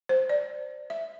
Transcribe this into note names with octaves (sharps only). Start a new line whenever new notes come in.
C5
D5
E5